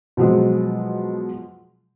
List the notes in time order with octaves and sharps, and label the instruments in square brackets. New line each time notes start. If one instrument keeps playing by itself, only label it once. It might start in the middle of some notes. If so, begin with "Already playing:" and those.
[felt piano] B2 F3 F#3 G#3